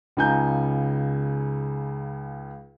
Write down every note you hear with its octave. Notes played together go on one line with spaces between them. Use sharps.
C#2 C#3 D#4 G#5 A#5 G6